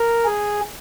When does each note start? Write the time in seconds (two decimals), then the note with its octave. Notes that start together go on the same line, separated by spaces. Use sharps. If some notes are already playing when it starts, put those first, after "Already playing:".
Already playing: A#4
0.25 G#4